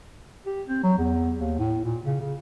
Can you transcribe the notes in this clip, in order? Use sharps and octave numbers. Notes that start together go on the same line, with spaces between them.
G4
C4
F#3
E2
D#2
A2
A#2
C#3
C#3